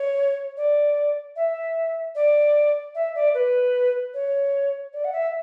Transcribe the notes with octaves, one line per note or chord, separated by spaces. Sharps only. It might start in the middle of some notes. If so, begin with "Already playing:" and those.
Already playing: C#5
D5
E5
D5
E5
D5
B4
C#5
D5
F#5
E5